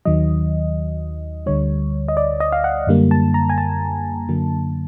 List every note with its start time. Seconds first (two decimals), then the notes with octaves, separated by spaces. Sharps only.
0.05 D#2 D#3 F#3 D#5
1.46 D2 D3 G3 C#5
2.08 D#5
2.17 D5
2.40 D#5
2.52 F5
2.64 F#5
2.87 F#2 D3 G3 A#3
3.11 A5
3.34 A#5
3.49 G#5
3.58 A5
4.29 F#2 D3 F#3 A#3